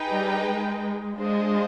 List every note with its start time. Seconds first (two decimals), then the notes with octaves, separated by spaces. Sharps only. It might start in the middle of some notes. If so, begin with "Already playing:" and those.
Already playing: D#4 G#4 B4 D#5 G5
0.08 G3
0.44 G#3
1.16 G#3 D4 F4 C5 D#5